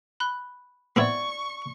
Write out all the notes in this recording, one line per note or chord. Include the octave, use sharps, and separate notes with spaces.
B5 F#6 G7
B3 C4 E4 D5 C#6 G#6 F#7